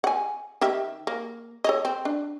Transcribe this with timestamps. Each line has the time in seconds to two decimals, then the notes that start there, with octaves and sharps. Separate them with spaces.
0.04 F#5 G#5
0.61 D#3 G4 E5
1.07 A#3
1.64 A4 C#5 D#5
1.85 C4
2.05 D4